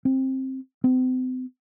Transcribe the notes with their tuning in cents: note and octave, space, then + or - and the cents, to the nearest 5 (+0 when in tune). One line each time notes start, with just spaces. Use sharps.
C4 +15
C4 -40